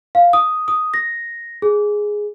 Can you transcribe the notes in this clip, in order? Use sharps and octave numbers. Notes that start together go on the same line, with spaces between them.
F5
D#6
D#6
A#6
G#4